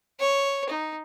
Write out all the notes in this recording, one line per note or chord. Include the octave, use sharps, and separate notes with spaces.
C#5
D#4